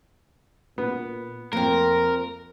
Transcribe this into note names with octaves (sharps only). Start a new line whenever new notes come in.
A#2 B3
F2 A#3 C4 A#4